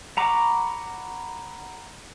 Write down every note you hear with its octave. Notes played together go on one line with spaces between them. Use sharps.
F#5 A#5 B5 C#6 D6